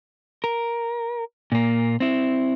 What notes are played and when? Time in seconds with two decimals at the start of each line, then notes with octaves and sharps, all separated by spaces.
0.44 A#4
1.52 A#2 A#3
2.00 C4 E4